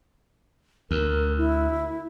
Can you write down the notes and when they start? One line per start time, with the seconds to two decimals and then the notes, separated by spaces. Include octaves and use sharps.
0.91 D2 A#4
1.37 E4